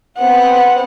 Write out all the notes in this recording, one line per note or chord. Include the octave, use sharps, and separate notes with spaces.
B3 C4 F#5